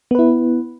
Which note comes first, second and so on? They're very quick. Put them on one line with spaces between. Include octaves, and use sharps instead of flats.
B3 B4 E4